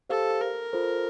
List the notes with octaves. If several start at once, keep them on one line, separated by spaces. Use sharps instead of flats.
G4 A4 C5 F5
A#4
F4 A4 C5